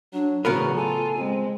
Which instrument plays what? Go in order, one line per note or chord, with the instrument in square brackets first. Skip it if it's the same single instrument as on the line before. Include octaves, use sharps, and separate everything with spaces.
[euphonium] F#3 [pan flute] D4
[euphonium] E2 [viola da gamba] A2 C#3 F#3 [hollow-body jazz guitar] B3 A#4 B4 [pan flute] F#4
[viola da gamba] F4 [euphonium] A4 [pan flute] G#5
[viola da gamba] G#3 [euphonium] C4